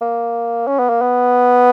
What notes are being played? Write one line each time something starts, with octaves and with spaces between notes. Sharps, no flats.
A#3
C#4
B3
A#3
B3